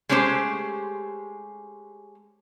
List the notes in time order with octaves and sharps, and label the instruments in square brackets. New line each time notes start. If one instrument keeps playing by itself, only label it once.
[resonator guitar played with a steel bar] G#3 A3 C#4 G4 C5